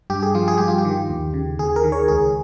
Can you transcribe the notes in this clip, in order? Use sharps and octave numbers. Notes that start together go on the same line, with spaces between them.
G2 G4
G#4
F3 F4
G#4
G2 G4
F4
G4
D#3
D#2
C#3
D#2 G#4
A#4
D#3
C#5
C#2 G#4